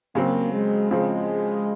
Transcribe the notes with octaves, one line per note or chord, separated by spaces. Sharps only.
C#3 F#3 A#3 C4
G#3
C#3 F3 G#3 C4